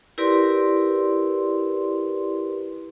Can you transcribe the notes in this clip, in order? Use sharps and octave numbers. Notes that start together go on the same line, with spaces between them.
E4 G4 A#4 B4 D5 C6